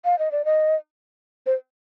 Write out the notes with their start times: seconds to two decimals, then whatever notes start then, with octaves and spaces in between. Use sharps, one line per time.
0.05 F5
0.19 D#5
0.32 D5
0.45 D#5
1.46 C5